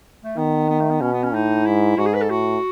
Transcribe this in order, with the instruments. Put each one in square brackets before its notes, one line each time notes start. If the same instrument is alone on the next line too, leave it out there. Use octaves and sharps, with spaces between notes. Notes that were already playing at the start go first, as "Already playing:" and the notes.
[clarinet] A3
[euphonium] D#3 [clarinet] B3
[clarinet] B3
A3
B3
[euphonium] B2 [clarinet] C#4
[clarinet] B3
C#4
[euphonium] A2 [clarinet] D#4
[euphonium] G#2 [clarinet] E4
[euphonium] G#2 [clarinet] F#4
[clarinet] G#4
B4
A4
[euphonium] A2 [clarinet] F#4